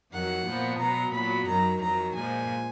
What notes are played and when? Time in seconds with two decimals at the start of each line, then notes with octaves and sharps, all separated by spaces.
0.12 F2 D#3 F#3 F#5
0.47 A#2 F3 B3
0.80 B2 F#3 B3 A#5
1.14 A#2 F#3 B3 B5
1.47 F#2 D#3 F#3 A#5
1.81 F2 D#3 F#3 A#5
2.15 A#2 F3 G#3 G#5